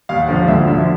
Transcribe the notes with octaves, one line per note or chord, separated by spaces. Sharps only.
D#2 F5
F#5
D3 F3
F5
D2 E5
D3 F3 E5